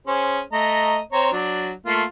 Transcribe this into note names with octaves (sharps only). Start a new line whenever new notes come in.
C#4 G#4 C5
A3 D#5 A#5
C4 C#5 A#5
F#3 D4
A3 A#3 F4